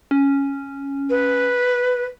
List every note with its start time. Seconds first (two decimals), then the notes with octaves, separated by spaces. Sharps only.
0.11 C#4
1.09 B4